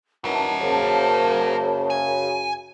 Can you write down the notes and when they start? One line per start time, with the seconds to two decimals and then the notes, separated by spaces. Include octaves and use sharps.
0.25 F#2 D#3 E3 A#4 F#5 A5
0.60 F#2 C#3 A#3 C5
1.90 G#5